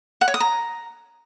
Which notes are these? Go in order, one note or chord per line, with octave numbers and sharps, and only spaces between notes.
F#5
C#5
D#6
A#5